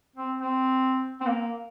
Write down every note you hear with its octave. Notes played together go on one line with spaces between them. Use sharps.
C4
C4
C4
A#3